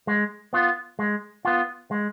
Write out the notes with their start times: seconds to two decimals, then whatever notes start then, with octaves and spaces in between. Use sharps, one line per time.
0.07 G#3
0.53 B3 F4
0.99 G#3
1.45 B3 F4
1.91 G#3